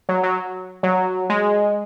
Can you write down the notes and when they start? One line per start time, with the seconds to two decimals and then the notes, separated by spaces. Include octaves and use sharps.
0.09 F#3
0.23 F#3
0.83 F#3
1.30 G#3